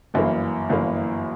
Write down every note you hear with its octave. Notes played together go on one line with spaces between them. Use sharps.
G1 F#2 E3 A#3
G1 F#2 E3 A#3